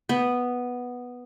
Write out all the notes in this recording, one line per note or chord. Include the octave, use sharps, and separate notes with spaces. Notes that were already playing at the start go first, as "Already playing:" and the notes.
B3